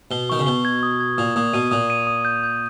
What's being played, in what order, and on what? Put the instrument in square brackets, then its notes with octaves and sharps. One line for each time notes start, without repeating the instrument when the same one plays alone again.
[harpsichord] B2 [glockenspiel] G7
[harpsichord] D#3 [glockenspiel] C#6
[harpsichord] C#3
[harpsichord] B2 [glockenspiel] G7
[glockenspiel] G#6
D#6
G#6
[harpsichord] A#2 [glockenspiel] D#6
[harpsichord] A#2 [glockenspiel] D#6
[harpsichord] B2 [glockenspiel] D#7
[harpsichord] A#2 [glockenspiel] D#6
[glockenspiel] D#7
D#6
G6
G6